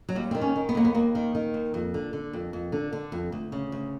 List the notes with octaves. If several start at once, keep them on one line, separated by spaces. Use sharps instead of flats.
F#3
D#2 G3
D#3 C4
C#4
D#3
B3
D#2 A#3
B3
D#2 A#3
D#3
D#3
D#2
F2
D3
D3
F2
F2
D3
D3
F2
D2
C#3
D2